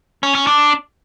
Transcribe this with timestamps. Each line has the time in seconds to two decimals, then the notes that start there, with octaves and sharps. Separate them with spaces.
0.23 C#4
0.35 C#4
0.47 D4